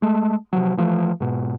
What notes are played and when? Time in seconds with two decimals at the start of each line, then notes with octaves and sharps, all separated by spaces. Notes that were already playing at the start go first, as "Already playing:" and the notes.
0.02 G#3 A3
0.53 C3 F3 F#3
0.77 E3 F3 A3
1.20 G#2 B2